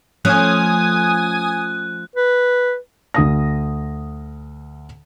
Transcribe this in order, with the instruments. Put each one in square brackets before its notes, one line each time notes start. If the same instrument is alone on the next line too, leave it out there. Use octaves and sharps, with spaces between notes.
[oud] F3 A3 C#4 [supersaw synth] G#5 D#6 [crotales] F#6
[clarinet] B4
[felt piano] D2 D#6 A#6